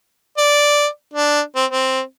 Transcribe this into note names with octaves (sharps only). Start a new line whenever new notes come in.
D5
D4
C4
C4